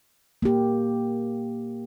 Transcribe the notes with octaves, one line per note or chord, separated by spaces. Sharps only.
A#3 G4